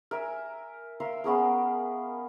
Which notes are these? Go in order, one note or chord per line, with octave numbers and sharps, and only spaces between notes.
A#4 E5 G#5
A#4 E5 F5 C6
B3 C#4 G#4 A#4